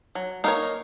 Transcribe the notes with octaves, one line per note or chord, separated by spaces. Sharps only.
F#3
A#3 D#4 A#4 C#5